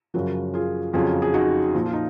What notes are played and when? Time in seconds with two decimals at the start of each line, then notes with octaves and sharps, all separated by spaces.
0.14 F#2 C#3 F3 F#4 A#4
0.54 F4 G#4
0.94 F2 C#3 F#3 F4 G#4
1.22 G#4
1.34 D#4 F#4
1.74 A#2 F3
1.86 F4
1.93 D#4